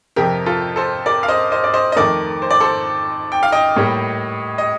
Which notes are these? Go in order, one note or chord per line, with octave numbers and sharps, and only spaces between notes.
F2 C3 F3 G4 A#4
F4 A4
A4 C5
A#4 D5
F5
C5 D#5
C5 D#5
D5
C5 D#5
D#5
F2 D#3 A3 A#4 D5
C5
D5
A4 C5
G5
F5
D#5 G5
A2 G3 A#3
D#5